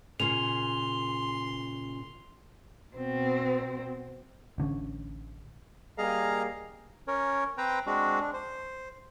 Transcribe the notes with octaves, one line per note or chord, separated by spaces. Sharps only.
A#2 C#3 C6 F7
B2 C4
A1 D3 C4 C#4
G3 A#3 G#4 D#5 F5 A#5
C#4 A#4 C#5
C4 B4 C5 G5 A#5
G#3 C4 D4 F#4
D4
C5